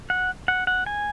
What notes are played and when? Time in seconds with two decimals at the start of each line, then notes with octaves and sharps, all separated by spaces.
0.10 F#5
0.48 F#5
0.67 F#5
0.86 G#5